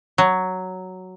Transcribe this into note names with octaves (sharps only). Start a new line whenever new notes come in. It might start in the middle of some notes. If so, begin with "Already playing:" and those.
F#3